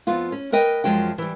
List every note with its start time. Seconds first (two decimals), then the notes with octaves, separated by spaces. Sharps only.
0.07 F2 B3 F4
0.32 C#4
0.52 A#4 B4 D#5 G5
0.84 F#2 F3 G#3 F#4 G5
1.18 E3 G3